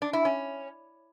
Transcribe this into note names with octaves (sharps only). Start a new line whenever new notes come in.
D4
E4
C#4